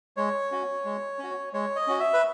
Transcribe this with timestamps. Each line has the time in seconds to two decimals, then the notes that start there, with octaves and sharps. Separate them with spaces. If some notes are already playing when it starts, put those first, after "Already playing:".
0.17 G#3 C#5
0.51 C#4 F#4
0.85 G#3
1.19 C#4 F#4
1.53 G#3 C#5
1.76 D#5
1.87 C#4 F#4
2.00 E5
2.13 B4